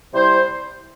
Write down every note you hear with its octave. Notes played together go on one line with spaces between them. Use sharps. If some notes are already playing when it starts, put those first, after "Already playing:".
C3 G3 E4 C5